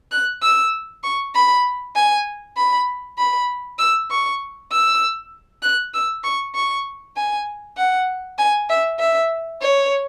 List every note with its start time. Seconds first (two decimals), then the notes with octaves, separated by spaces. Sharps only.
0.11 F#6
0.42 E6
1.03 C#6
1.34 B5
1.95 G#5
2.57 B5
3.18 B5
3.78 E6
4.10 C#6
4.71 E6
5.63 F#6
5.94 E6
6.24 C#6
6.55 C#6
7.16 G#5
7.77 F#5
8.38 G#5
8.69 E5
8.99 E5
9.61 C#5